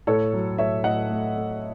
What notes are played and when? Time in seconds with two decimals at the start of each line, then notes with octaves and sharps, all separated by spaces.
0.07 A2 A4 C#5
0.33 F#3
0.58 A2 C#5 E5
0.84 A2 D#5 F#5
1.10 A3
1.36 A3